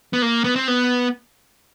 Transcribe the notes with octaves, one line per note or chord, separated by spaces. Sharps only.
B3
A#3
B3
C4
B3